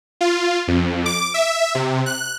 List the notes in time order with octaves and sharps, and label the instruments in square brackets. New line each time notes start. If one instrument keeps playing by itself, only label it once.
[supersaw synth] F4
F2
D6
E5
C3
F#6